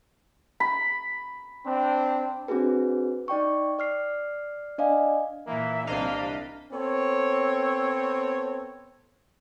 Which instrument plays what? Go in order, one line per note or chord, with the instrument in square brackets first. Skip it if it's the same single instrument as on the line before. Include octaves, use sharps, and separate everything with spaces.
[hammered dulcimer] B5
[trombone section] C4 D4
[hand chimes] C4 D4 F#4 G#4 B4
D#4 D5 G5 C#6
D5 F6 C7
D4 D5 D#5 F5 G#5
[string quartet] A#2 E3 [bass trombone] A#3 [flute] E5
[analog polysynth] C2 C3 F5 [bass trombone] A#3 [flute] D4 [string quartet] D#5 B5
[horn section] B3 C4 A4 C#5